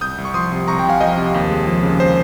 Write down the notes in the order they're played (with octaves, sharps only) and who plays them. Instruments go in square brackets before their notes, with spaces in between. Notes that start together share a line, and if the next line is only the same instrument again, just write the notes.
[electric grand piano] C2 D#6 G6
C2
C#6
F3 C6 D#6
C3
C2 A#5 C#6
C2 G5 A#5
F5 G#5
F3 D#5 G5
C3
D#2
G#3
F3
C#3
C5